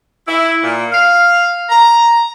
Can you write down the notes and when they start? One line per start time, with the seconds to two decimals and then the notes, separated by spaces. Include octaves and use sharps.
0.27 E4
0.63 A#2
0.92 F5
1.69 A#5